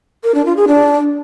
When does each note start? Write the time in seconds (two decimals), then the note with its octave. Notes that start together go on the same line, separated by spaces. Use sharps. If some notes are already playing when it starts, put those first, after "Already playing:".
0.24 A#4
0.35 D4
0.46 F4
0.57 G#4
0.68 D4